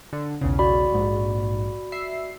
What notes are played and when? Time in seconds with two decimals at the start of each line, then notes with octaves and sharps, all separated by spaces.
0.13 D3
0.41 B1 E2 C#3
0.59 F#4 D5 B5
0.92 A#1 G#2
1.92 E5 C7